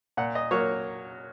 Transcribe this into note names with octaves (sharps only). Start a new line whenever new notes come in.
A#2 F#5
D#5
F#3 A#3 C#5